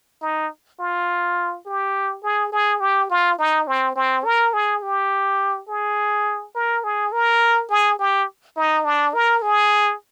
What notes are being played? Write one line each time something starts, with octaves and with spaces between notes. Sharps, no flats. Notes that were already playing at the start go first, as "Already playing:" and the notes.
D#4
F4
G4
G#4
G#4
G4
F4
D#4
C4
C4
A#4
G#4
G4
G#4
A#4
G#4
A#4
G#4
G4
D#4
D4
A#4
G#4